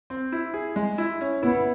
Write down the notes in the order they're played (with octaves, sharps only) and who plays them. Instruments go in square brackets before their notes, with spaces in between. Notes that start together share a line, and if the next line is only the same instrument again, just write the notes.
[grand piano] C4
E4
G#4
G#3
E4
C#4
[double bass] B3 [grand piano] E4